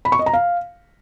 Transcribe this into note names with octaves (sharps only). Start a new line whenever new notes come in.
B5
C#6
D#5
A#5
F5